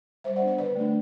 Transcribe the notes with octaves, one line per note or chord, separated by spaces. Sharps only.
G3 C5 E5
D5 F#5
B3 D4
D5 F#5
D3 B4 D5
A3 D4